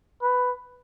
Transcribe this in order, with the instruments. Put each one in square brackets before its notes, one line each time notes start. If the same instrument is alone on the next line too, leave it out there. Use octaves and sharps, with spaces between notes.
[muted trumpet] B4